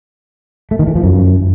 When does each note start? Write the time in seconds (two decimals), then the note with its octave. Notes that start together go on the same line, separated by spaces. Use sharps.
0.71 A3
0.79 D#3
0.87 E3
0.95 F3
1.04 F#2